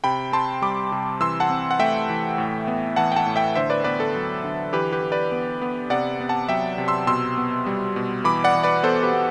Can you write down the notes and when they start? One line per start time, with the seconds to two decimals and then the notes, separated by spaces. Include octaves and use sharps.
0.04 C3 G5 B5
0.32 C4 A5 C6
0.62 G3 B5 D6
0.92 C3
1.20 E3 C6 E6
1.40 F#5 A5
1.50 C4
1.71 F#5
1.79 A3 E5 G5
2.09 E3
2.38 A2
2.67 B3
2.96 E3 F#5 A5
3.12 G5
3.16 F#5 A5
3.26 A2
3.36 E5 G5
3.55 D3 C5 E5
3.70 B4 D5
3.84 B3 B4 D5
4.00 A4
4.15 F#3
4.44 D3
4.73 E3 G4 B4
4.92 G4 B4
5.03 E3
5.12 B4 D5
5.32 B3
5.62 B3
5.90 C3 D5 F#5
6.20 B3
6.29 F#5 A5
6.48 F#3 E5 G5
6.78 C3
6.88 C6 E6
7.07 B2 C6 E6
7.37 B3
7.66 G3
7.96 B2
8.24 E3 B5 D6
8.44 D5 F#5
8.55 E3
8.63 B4 D5
8.83 B3 A4 C5
9.03 G4 B4
9.13 B3